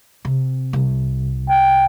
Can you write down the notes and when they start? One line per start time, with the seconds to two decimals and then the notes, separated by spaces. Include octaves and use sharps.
0.25 C3
0.73 C2
1.49 G5